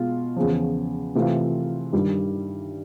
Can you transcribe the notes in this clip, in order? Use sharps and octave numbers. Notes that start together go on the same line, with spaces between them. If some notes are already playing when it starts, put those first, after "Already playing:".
Already playing: B2 G#3 F4
E2 C#3 F3
C3 E3 A3 C4 F4
G2 D#3 G3